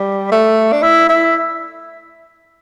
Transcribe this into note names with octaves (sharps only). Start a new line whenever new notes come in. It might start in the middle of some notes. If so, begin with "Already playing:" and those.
Already playing: G3
A3
D4
E4
E4